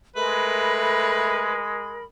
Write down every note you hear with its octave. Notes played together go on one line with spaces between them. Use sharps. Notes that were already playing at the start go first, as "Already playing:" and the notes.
G#3 A3 A#4 B4 B5